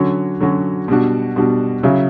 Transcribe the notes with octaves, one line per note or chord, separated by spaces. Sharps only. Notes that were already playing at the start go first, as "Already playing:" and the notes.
Already playing: D3 F#3 C#4 F#4
D3 F#3 C#4 F#4
B2 G3 D4 F#4
B2 G3 D4 F#4
C#3 F#3 C#4 E4